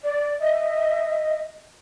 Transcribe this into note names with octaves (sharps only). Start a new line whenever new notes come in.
D5
D#5 E5